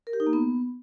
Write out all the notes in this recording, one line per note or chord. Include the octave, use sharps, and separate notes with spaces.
A#4
G4
D#4
A#3
B3